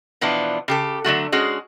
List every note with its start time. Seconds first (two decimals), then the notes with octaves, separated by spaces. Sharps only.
0.21 B2 E3 F3 B3 D4
0.68 C#3 G4 A4
1.04 D3 F#3 A3 F#4
1.32 G#3 C#4 F#4 G#4